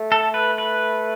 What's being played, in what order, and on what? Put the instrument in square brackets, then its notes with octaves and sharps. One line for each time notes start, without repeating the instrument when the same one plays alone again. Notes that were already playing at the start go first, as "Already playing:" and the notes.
Already playing: [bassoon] A3
[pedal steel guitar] A4
B4
B4